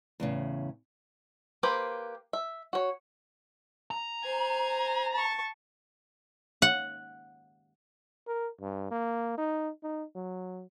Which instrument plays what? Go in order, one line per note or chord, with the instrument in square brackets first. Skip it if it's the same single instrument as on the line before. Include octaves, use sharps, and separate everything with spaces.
[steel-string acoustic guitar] E2 A2 C#3
[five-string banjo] A#3 G4 B4 C5
E5
F#4 C#5
[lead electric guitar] A#5
[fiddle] C5 G#5
A5 C#6
[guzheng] F#5
[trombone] A#4
G2
A#3
D#4
D#4
F#3